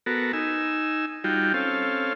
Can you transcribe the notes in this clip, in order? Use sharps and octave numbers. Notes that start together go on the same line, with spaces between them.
B3 F#4 A4 A#4
D#4 G#5 E6
G3 D#4 F4 F#4 G5
C4 C#4 A4 F5